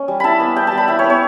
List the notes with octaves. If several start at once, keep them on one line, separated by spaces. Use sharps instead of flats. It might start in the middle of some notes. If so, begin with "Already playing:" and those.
Already playing: C#4
G3
E4 A5 B5
B3
G3 G5
G3 A5
B5
E4 G5
C#5
B3
C#5